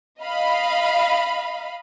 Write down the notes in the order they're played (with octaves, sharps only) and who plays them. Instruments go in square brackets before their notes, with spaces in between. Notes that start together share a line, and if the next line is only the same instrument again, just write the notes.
[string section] D#5 F5 B5